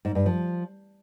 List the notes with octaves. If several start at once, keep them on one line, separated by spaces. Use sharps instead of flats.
G#2
G2
F3